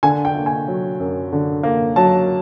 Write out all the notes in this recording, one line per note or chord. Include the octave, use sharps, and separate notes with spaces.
D3 G#5
G5
A#3
G#5
F#3
F#2
D3
A#3
F#3 A5